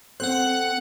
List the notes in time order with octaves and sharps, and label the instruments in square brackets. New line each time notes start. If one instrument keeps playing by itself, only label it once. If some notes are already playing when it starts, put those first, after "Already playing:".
[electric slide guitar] C4 A4 C5 [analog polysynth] F#5 F#6